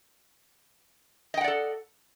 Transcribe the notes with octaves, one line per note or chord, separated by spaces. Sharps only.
A4 D5 D#5 F#5 G5